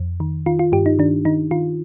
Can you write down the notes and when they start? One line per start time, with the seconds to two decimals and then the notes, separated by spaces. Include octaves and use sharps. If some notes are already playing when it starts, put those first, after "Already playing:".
Already playing: F2
0.20 D#3
0.46 D#3 F4
0.59 F4
0.72 G2 G4
0.86 D#4
0.99 D#3 D4
1.25 D#3 D#4
1.51 D#3 F4